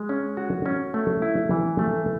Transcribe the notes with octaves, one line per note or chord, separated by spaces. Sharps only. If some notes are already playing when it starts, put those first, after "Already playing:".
Already playing: G#3
C#4
F#4
C#4
A3
E4
E3
A3